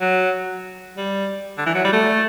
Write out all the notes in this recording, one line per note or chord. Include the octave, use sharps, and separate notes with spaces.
F#3
G3
D3
E3
F#3
G3
A3